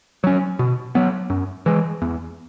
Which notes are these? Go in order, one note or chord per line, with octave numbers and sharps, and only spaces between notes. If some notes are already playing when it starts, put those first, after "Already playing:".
F#3 C#4
B2
F#3 B3
F#2
E3 G#3
E2